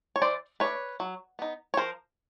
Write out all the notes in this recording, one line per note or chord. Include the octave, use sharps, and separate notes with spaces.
C#5
E3 C5 D5
A3 D4 B4 C#5
F#3
B3 D#4
C#5
F3 A#4 C5